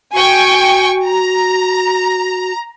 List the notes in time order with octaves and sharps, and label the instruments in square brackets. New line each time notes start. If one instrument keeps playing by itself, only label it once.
[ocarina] F#4 [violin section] G5 G#5 C#6
[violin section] A#5